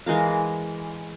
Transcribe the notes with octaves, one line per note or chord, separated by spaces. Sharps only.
E3 G#3 A#4 F5